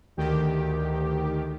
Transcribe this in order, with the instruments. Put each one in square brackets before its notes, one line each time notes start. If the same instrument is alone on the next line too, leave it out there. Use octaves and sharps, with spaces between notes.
[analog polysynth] D2 D#3 G4